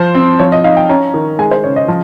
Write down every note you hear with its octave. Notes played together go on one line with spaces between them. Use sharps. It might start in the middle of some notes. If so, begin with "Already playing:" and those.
Already playing: F3 C5
C4
F3 C#5
D#5
D#4 F5
G5
C#4 A#5
D#3
G#3 G#5
C5
C#3 C#5
D#5
F3